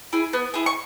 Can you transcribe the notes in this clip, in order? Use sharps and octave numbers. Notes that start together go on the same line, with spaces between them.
E4 G#4
B3
E4 G#4
C#6